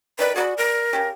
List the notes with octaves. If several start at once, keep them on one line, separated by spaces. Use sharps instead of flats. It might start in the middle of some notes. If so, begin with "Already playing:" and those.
D#3 B4 D5
F#4 G#4 D5 B5
A#4
C#3 C#4 G4